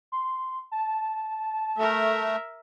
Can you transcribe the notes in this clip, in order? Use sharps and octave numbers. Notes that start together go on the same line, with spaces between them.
C6
A5
A3 A#4 E5